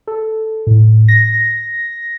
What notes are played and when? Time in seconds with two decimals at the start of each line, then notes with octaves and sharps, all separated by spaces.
0.07 A4
0.67 A2
1.08 A#6